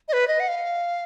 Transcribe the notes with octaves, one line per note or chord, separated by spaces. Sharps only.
D#5
B4
D#5
F#5
F5